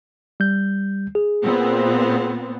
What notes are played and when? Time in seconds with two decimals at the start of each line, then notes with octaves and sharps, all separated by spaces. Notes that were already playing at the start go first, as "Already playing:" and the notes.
0.40 G3 G6
1.15 G#4
1.44 A#2 B3 C4